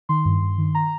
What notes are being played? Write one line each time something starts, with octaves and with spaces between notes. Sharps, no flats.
D#3 C6
G2
G2
D#3
A#5